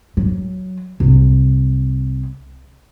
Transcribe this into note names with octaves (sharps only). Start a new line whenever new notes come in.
F#3
C2